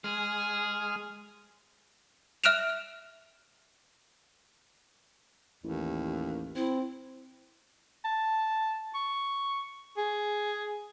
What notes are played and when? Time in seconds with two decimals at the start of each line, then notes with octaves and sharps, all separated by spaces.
0.04 G#3 G#4 F6
2.44 E5 F6 F#6 D7 E7 F7
5.64 A1 D#2
6.56 C4 E4
8.04 A5
8.95 C#6
9.97 G#4